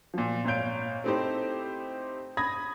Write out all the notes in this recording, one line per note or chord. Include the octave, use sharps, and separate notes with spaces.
A#2 F3
G#1 A#2 C#5 F5 G6 D7
A3 C4 D#4 E4 G4 C5
B5 D#6 G#6 A#6